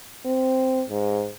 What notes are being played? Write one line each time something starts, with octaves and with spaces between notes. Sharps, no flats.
C4
G#2